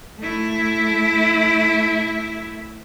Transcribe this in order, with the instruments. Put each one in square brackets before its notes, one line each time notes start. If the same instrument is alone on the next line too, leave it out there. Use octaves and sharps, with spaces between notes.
[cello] A3 E4